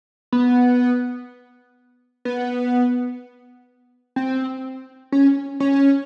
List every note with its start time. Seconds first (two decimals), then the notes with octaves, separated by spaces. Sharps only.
0.32 B3
2.25 B3
4.16 C4
5.12 C#4
5.60 C#4